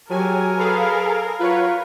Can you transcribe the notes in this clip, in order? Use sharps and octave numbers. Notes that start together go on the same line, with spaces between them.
F#3 G4 G#4 A#4 G#5 A5
G#4 A4 B4 F5 B5
F#3 F4 B4 C#5